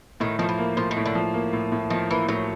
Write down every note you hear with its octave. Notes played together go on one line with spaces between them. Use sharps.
A2 D#3
D#3 F3
E3
A#3
A2 F3
D#3
A2
D3
F3
A#3
A2
A2
D#3 F3
E3 A#3
A2 F#3